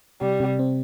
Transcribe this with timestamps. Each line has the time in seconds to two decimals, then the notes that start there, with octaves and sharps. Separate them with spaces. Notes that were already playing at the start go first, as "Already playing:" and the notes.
0.21 C3 G3
0.40 C3
0.59 C4